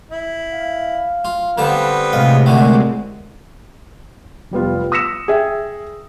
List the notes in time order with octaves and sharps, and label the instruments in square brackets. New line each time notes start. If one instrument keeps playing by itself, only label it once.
[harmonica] E4
[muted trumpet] F5
[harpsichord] F4
[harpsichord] D3 A5 [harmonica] G3 B3 C4
[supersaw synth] A2 C3 G#3 [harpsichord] D#5 [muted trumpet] F5
[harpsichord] A#2 D3 A3 [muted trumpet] F#5
[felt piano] F1 G3 B3 F4
D#6 E6 A#6 B6 C#7 E7
G#4 E5 G5